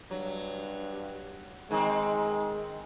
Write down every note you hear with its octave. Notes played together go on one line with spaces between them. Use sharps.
G2 F#3
D#3 G#3 C4